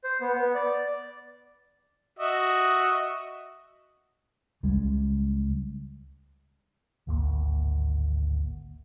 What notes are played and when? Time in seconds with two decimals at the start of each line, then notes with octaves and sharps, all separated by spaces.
0.04 C5
0.21 B3
0.34 B3
0.55 D5
2.19 F#4 D#5 E5
4.63 C#2 C#3 G3 G#3
7.07 D1 G#1 D2 A#3